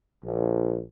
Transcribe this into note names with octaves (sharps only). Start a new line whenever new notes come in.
A#1